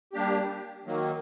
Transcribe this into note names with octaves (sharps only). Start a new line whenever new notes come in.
G3 A#3 D4 G4
D#3 F#3 A#3